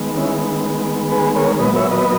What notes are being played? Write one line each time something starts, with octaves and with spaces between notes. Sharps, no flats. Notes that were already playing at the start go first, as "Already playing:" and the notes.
Already playing: D#3 G#3 B3
C#4 E4
G#4 B4
A#4 C#5
A#2 F#3 B3 B4 D#5
C#5 E5
B4 D#5